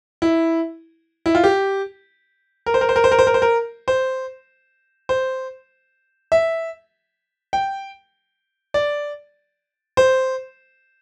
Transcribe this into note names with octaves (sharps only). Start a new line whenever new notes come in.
E4
E4
F4
G4
A#4
C5
A#4
C5
A#4
C5
A#4
C5
A#4
C5
A#4
C5
C5
E5
G5
D5
C5